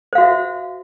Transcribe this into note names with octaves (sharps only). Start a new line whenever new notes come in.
F#4 C5 E5 F5